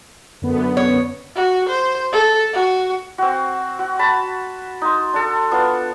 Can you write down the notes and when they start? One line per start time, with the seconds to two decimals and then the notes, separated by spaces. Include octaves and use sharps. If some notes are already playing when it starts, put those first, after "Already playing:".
0.42 F#2 D3 B3
0.77 C#5
1.35 F#4
1.69 C5
2.13 A4
2.54 F#4
3.18 C4 F#4
3.79 F#4
3.99 A5 B5
4.82 D#4 C6
5.13 D4 A4
5.51 B3 D4 F4